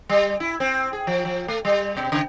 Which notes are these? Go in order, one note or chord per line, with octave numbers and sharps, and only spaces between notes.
G3
E4
C4
G#4
F3
F3
A3
G3
B2
C#3